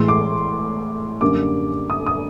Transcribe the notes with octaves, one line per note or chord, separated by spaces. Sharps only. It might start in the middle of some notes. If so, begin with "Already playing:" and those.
Already playing: A2 E3 G#3 C6
D6
F#2 D3 G3 A#3 D6
D#6
D#6